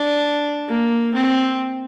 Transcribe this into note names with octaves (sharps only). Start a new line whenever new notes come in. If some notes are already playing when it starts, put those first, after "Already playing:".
Already playing: D4
A#3
C4